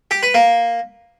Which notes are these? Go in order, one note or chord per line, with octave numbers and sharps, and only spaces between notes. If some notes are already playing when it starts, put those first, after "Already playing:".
G4
B4
A#3